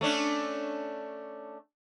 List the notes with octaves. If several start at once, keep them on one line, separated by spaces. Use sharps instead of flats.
A3 C#4 D4